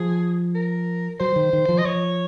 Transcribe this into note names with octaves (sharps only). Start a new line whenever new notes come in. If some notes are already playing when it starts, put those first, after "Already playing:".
Already playing: F3 G#4
A#4
F#3 C5
D#3
D#3
F3
D#5
F3 C#5